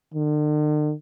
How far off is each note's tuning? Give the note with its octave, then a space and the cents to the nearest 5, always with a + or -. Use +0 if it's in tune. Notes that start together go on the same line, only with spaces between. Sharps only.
D3 +45